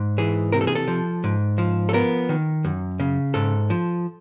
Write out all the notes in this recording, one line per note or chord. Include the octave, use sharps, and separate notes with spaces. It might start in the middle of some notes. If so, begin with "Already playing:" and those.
Already playing: G#2
E3 G#4
C3 A#4
A4
G#4
A4
F3
G#2
F3
A4
B3 A#4
D#3
F#2
C#3
G#2 A4
F3